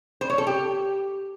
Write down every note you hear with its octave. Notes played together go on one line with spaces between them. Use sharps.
C5
C#5
A4
G4